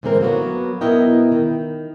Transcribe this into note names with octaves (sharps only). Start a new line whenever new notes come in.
G#2 D3 E3 C4 A#4
F#3 A#3 B3 F#4
B2 B3 E4 A#4 D#5 G5
D#3